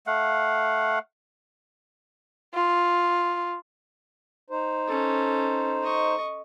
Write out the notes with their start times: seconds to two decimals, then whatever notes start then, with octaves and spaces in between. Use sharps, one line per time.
0.07 A3 F5 F#5
2.54 F4
4.50 D#4 C5
4.88 C#4 A4
5.83 D#5 C#6